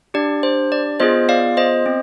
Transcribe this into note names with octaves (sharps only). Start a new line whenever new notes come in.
D4 G4 D5
C5
D5
B3 F4 G#4 C5 D#5
D5 F5
C5 D#5
C4